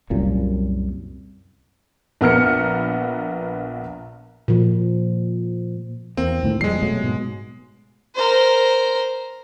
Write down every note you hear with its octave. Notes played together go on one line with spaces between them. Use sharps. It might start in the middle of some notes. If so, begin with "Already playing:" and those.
C2 F#2 A#2
A#1 B3 A#4 F6 C#7
A#2 F3
E2 A#3 C4
D2 A2 D#3
F2 A#2 G3 G#3 C7
B2 F#3 A3
G#2 B2
A#4 C5